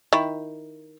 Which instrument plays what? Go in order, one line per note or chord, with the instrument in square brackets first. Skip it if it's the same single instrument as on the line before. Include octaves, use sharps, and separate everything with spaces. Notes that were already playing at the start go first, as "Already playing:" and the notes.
[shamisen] D#3 E4